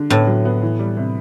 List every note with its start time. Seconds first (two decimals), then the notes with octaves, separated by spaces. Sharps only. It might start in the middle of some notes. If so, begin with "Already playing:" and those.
Already playing: D3
0.10 A2 B3
0.27 F#3
0.45 B3
0.62 E3
0.79 G3
0.97 C3